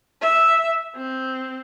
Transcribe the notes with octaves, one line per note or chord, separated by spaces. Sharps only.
E5
C4